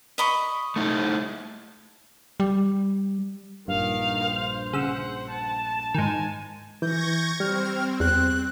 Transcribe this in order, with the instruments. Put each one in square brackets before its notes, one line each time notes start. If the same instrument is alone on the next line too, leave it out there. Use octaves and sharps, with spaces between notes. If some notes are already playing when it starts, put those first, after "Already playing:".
[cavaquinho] D#5 B5 C#6
[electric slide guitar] A3 D#4 E4
[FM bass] G3
[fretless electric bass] A#1 G2 [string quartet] D#3 [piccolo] F5
[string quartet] C5
[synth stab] C#3 E6 [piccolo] F#5
[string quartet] A5
[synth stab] G#2 D#3 [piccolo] G#5
[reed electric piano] E3 [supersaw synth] C#6 G#6 A#6 [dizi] G6
[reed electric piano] G3 [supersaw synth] C4 [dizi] F6
[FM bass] E2 [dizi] F#6